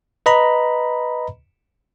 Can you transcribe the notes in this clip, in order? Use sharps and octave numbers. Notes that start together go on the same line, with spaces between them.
B4 D#5 A#5 B5